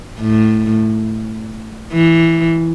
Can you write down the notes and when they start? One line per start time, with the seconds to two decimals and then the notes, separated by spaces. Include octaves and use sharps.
0.19 A2
1.93 E3